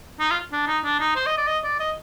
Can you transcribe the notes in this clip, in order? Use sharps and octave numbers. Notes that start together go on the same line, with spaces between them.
D#4
F4
D4
D#4
D4
D#4
C5
D#5
D5
D#5
D5
D#5